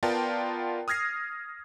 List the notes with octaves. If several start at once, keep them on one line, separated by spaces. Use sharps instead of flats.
B3 F4 A#4 D5 G5 A5
D#6 F6 G#6 A#6 C7